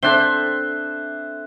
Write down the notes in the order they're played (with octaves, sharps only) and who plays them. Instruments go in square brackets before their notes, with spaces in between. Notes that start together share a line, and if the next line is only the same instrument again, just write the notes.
[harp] C4 D4 A4 [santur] C5 E5 [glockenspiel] F#6 G7